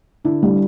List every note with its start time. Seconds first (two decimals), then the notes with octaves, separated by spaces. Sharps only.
0.25 D3 D4 E4
0.42 G3